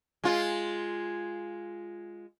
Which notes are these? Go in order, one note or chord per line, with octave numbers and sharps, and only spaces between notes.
G#3 F4